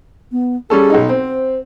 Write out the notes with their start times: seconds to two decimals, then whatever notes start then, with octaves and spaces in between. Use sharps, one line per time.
0.32 B3
0.70 G3 C#4 G#4 A4
0.90 B1 D#4
1.09 C4 C5